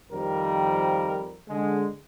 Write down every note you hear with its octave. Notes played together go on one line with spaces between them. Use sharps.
F2 D#3 F3 G3 A#4
D3 G#3